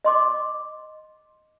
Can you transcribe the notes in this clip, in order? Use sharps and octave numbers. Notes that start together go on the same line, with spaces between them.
D#5 C6 D6